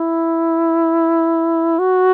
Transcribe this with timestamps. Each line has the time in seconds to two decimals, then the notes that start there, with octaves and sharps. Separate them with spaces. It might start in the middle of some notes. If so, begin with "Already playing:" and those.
Already playing: E4
1.79 F#4